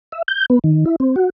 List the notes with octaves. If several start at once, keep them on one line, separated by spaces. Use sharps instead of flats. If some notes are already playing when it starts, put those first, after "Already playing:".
E5
G6
B3
D#3
E4
C4
F#4